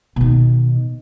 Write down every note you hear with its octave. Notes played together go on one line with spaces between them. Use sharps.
B2 D#3